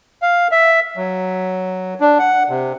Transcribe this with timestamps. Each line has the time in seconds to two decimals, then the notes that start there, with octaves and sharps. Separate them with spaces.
0.22 F5
0.51 E5
0.97 F#3
2.01 D4
2.19 F#5
2.49 C3